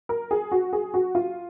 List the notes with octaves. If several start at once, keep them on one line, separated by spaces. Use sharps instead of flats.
A#4
G#4
F#4
G#4
F#4
F4